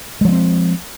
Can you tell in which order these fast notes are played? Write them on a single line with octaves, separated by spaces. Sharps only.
G#3 F3 B3 C4